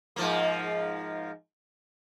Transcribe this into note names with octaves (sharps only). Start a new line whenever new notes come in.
G#2 F3 A#3